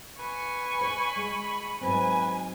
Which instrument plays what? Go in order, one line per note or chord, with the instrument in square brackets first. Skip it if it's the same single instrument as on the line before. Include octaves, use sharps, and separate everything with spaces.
[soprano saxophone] B4 [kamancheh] G#5 C#6
[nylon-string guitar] C5 C#5 [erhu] B5
[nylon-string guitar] G#3
[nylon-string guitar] G#2 F#3 C4 [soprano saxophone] B4 [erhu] G#5